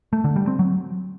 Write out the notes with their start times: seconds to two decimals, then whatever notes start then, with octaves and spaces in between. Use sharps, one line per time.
0.13 A3
0.24 D3
0.36 G3
0.48 C4
0.59 F#3